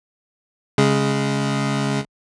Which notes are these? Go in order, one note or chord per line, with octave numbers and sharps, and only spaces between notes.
C#3 G#3